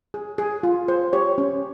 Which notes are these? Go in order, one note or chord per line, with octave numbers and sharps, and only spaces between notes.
G#4
G#4
F4
C5
G4 C#5
C#4